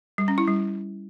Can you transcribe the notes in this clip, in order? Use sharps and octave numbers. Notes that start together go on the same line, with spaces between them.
G3
C#4
E4
G3